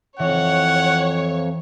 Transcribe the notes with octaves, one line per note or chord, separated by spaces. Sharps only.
F2 E3 C#5 F#5